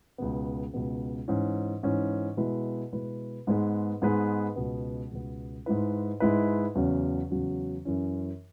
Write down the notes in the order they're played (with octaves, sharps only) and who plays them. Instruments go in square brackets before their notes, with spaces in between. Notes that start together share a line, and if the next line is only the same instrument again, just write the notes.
[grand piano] C#2 B2 B3
C#2 B2 B3
G#2 E3 C#4
G#2 E3 C#4
B2 G#3 E4 B4
B2 G#3 E4 B4
G#2 G#3 B3 G#4 B4
G#2 G#3 B3 G#4 B4
C#2 B2 B3
C#2 B2 B3
G#2 G#3 E4 B4
G#2 G#3 E4 B4
E2 C#3 F#3 C#4 F#4
E2 C#3 F#3 C#4 F#4
F#2 E3 C#4